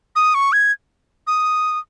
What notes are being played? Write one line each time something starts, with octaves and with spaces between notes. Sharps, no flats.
D#6
C#6
G#6
D#6